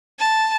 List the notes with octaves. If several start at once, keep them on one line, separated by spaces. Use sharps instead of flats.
A5